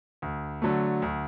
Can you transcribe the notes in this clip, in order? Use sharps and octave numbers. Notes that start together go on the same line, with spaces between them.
D2
D3 F#3 A3
D2